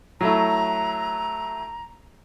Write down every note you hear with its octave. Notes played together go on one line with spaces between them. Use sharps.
F#3 A3 E4 A#5